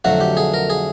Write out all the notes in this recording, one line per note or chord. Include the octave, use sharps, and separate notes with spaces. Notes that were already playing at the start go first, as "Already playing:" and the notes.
F2 D3 F#3 A3 F#4
G4
G#4
A#4
G#4